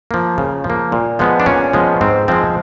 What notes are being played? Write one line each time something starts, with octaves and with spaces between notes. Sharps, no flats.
F3 A#3
C#3
F3
A#3
A#2
F3 G#3 B3
D4
A#2 C#4
F3 G#3 B3
G#2 C4
F3 G#3 C4